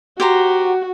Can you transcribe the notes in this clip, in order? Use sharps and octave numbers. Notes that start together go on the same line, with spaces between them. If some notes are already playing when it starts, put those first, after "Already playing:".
F#4 G4 C5 A#5